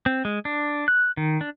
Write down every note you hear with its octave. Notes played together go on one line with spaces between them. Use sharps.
C4
G#3
D4
F#6
D#3
D4